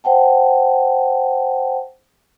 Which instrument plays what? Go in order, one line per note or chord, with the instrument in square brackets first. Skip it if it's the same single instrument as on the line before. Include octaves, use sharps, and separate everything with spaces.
[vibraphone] C5 F#5 G5 A5